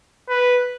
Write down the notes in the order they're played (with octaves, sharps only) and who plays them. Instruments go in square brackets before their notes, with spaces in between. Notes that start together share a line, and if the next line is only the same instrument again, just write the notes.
[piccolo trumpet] B4